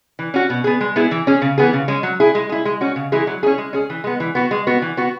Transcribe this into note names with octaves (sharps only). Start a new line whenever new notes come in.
E3
C#4 F#4
B2
B3 G#4
G#3
B3 E4 G#4
E3
C#4 G#4
C#3
E3 B3 G#4
C#3
G#3 C#4
F#3
E4 G#4
G#3
E4 G#4
G#3
C#4 F#4
C#3
E3 G#3 E4 G#4
F#3
C#4 E4 G#4
G#3
C#4 G#4
E3
G#3 B3
E3
B3 F#4
G#3
B3 F#4
E3
B3 F#4